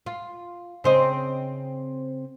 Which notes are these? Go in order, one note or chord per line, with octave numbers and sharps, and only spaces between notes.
F4
C#3 C4 D#5